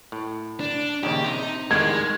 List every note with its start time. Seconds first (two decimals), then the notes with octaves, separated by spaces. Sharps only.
0.12 A2
0.60 D4
1.03 A#1 D#2 C#3 G4
1.24 C3 D#4
1.71 A2 D#3 G3 G#3 G#6